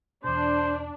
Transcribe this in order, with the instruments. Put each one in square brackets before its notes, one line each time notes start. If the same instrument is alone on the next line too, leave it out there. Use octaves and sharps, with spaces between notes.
[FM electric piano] E2 B2 [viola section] D4 [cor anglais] C5